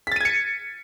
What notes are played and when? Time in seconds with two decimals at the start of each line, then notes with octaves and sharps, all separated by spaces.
0.07 B6
0.12 A6
0.16 D#7
0.21 G#6
0.25 C#7